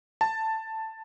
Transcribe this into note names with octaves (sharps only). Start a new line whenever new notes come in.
A5